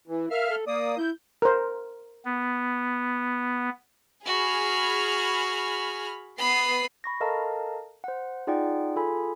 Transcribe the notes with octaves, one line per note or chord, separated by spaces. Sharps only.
E3 E4
A#4 E5 F5 F6
A4
A#3 D5 D#6
E4 G6
A#4 C5
B3
F#4 G#4 B5 F6
B3 B5 D#6 C7
B5 C#6 A#6
A4 A#4 D#5 F5 A5 A#5
C5 F#5
D#4 F4 G#4 D5 F#5 G5
F4 G#4 A4 G#5 B5